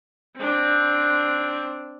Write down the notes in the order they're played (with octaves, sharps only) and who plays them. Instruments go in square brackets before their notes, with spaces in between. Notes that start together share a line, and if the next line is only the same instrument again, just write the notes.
[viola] C4 D4